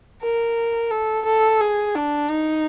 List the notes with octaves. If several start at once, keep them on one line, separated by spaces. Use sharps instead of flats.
A#4
A4
A4
G#4
D4
D#4